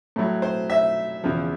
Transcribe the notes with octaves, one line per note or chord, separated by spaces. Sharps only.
A2 F#3
C5
E5
E2 C#3 F3